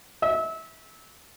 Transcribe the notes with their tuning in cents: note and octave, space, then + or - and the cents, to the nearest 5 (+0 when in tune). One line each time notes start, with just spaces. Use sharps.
E5 -25